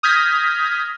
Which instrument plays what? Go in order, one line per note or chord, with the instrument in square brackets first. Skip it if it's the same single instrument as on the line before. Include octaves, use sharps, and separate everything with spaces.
[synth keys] D#6 F6 G6 G#6 A#6 B6